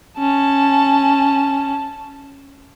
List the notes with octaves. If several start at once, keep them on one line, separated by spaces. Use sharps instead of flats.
C#4 A5